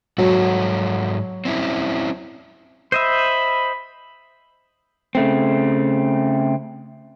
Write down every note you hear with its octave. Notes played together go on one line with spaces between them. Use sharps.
G#2 F#3 F#4 A4
C4 C#4 E4
C5 D#5 E5 B5
C#3 A3 C4